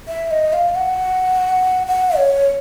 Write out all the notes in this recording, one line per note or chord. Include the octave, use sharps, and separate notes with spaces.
E5
D#5
F5
F#5
F#5
C#5